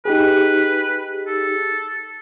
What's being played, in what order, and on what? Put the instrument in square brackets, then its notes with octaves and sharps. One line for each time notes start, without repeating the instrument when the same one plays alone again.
[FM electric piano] D#4 G4 G#4 [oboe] B4
[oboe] A4